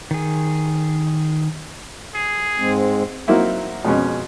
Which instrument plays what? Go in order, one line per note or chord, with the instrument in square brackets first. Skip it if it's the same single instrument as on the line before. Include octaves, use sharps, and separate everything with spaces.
[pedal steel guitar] D#3 G#4
[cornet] G#4
[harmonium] G#2 G#3 C4
[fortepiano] F#3 A#3 C4 D#4 E4
F2 B2 G#3 C#4